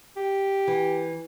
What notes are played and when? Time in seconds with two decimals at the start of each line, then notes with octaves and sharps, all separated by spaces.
0.16 G4
0.67 E3